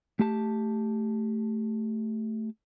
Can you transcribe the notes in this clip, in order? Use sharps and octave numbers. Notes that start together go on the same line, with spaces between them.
A3 G4 A5